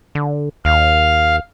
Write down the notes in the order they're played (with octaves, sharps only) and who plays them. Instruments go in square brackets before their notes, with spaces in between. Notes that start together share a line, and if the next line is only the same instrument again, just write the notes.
[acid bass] D3
[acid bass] D#2 [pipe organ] F5